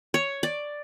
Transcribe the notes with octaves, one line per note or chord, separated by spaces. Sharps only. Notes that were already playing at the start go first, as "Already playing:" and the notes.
C#5
D5